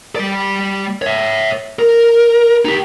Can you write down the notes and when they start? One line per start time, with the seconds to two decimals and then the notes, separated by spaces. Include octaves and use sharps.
0.16 G3 D5
1.02 C#5 E5
1.79 A#4
2.65 D#4 G4